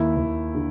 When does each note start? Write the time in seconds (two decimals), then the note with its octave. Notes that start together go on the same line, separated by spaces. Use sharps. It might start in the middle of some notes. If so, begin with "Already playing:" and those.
Already playing: D#2 E4
0.17 D#2
0.55 D3